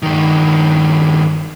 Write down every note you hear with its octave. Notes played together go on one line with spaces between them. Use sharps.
G2 D#3